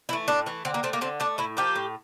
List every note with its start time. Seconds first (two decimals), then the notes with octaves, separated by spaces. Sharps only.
0.09 E3 A3 E4
0.28 A2 D4
0.46 E3 A3
0.65 D3 C4
0.74 A#3
0.83 A3 C4
0.93 A#3
1.01 D3 C4
1.20 A3 D4
1.38 A2 E4
1.57 F3 A#3 G4
1.76 A2